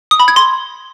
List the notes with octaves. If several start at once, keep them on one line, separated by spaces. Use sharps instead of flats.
D#6
B5
G#6
C6